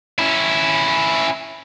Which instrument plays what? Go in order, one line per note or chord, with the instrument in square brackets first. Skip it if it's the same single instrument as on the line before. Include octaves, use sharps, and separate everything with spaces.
[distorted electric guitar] C#4 E4